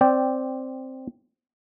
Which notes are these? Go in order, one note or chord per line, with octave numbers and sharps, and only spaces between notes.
C4 D5 G5